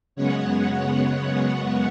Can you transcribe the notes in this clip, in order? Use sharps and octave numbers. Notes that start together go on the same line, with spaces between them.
F#2 C#3 G#3 B3 C#5 F#5
C#5 F#5